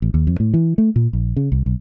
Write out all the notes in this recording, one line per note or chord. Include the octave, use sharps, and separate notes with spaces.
A1
D#2
F2
A2
E3
A3
A#2
A#1
C#3
C2
B1